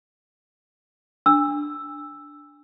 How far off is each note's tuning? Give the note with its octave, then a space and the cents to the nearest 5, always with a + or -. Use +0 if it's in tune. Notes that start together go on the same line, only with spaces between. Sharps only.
D4 +0 E6 +0